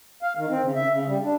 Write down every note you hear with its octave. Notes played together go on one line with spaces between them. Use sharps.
F5
D#3
C4
C#3
E5
C#3
G3
D4